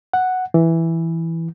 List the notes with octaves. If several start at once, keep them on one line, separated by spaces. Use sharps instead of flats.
F#5
E3